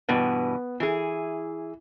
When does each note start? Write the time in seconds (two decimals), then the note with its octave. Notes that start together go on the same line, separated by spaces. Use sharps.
0.09 G2 B2 E3 B3
0.80 E3 E4 G#4